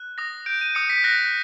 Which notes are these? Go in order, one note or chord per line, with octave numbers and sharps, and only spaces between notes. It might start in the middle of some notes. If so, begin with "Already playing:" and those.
Already playing: F#6
D#6 A#6
G6 D7
D#7
D#6 C#7
B6
F#6 A#6